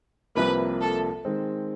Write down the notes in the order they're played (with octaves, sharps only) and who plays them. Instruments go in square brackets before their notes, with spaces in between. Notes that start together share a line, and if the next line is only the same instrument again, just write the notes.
[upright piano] C2 C3 F3 A#3 [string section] B4
[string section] A4
[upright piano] D#3 G#3 C4